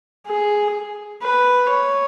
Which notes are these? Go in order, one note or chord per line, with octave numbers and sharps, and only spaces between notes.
G#4
B4
C#5